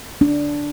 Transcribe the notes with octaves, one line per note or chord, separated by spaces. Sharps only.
D4